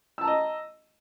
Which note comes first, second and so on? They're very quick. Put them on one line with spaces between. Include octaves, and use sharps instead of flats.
E6 A5 A#5 D#5